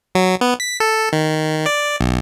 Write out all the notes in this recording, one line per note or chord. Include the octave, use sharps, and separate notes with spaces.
F#3
B3
B6
A4
D#3
D5
B1